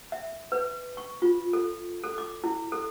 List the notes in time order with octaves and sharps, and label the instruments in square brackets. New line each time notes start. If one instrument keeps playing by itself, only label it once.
[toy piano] E5
B4
C#6
F4
A4
A4
D6
E4
A4